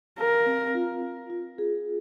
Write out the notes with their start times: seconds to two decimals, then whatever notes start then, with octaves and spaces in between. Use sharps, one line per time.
0.18 A#4 F5
0.46 C4
0.75 F4
1.02 F4
1.30 F4
1.58 G#4